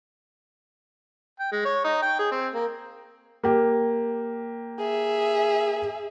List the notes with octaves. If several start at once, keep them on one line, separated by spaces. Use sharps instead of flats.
G5
G#3
C#5
D#4
G5
G#4
C4
A#3
A#3 G4
G#4 E5